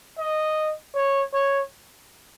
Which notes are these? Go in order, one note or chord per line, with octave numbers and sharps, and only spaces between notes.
D#5
C#5
C#5